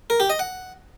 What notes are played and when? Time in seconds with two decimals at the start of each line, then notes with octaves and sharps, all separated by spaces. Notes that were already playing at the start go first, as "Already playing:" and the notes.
0.10 A#4
0.20 G4
0.30 D#5
0.39 F#5